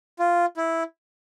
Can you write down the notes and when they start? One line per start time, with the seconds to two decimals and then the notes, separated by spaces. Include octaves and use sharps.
0.19 F4
0.57 E4